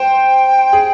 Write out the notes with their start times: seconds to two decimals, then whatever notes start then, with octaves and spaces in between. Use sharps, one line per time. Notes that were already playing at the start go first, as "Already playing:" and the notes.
Already playing: C5 G5
0.73 G#4